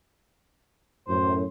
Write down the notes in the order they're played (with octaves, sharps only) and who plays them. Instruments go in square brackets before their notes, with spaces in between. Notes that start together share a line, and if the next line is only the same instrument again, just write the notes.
[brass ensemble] F#2 A2 [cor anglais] C5